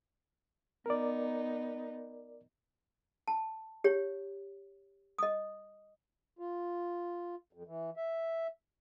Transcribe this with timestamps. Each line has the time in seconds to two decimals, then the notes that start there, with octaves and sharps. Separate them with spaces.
0.86 B3 D#4 A#4 D5
3.28 A5
3.84 G4 C#5
5.18 D#5 D#6
6.39 F4
7.53 F2
7.66 E3
7.97 E5